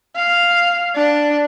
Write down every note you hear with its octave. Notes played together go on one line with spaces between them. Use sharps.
F5
D4